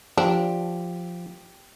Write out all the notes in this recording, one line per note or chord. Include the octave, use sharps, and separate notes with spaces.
F3 D4 G4